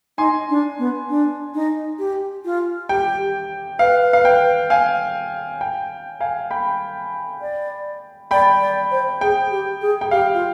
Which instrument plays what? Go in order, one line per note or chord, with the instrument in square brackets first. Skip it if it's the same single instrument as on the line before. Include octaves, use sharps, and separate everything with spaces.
[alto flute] D#4 [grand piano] G#5 C6
[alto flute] D4
B3
D4
D#4
G4
F4
[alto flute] G4 [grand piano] G5
[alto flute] B4 [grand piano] F5
[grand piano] F5
G5
F5 G#5
G5
F5 G#5
G5 B5
[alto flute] D5
[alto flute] D5 [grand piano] G5 B5
[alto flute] D5
C5
[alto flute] G#4 [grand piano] G5
[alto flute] G4
G#4
[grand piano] G5
[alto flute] G4 [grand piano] F5
[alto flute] F4